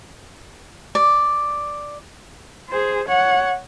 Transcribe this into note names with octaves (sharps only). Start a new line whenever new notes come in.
D5
G#4 C5
C#5 F#5